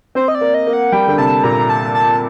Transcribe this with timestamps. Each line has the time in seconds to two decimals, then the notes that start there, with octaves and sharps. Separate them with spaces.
0.15 C4 C5
0.28 D#5
0.35 D5
0.41 A#3
0.54 D#5
0.67 A#3
0.73 F#5
0.92 G3 G5
1.07 D3
1.18 C3 A5
1.44 A#2 A#5
1.69 A5
1.95 A5